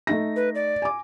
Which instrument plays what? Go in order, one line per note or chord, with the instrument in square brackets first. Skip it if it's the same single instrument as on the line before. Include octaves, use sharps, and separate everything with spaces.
[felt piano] A3 D#4 A#6
[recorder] B4
D5
[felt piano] G#5 D6